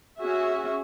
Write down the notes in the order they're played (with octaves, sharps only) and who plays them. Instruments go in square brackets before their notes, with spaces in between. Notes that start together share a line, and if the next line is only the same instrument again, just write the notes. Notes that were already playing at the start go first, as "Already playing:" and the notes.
[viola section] C#4 F#4 G#4 E5